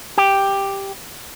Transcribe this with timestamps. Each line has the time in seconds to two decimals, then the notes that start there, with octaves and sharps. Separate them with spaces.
0.18 G4